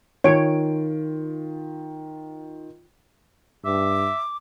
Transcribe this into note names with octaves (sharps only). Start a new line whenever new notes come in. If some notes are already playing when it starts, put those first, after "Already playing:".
D#3 F4 C#5 D7
G2 E5 D6